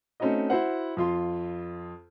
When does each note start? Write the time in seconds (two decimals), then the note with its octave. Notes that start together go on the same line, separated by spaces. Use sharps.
0.20 A3 C4 C#4 D#4 F#4 D#5
0.50 E4 F#4 C5 F#5
0.97 F2 F4 C6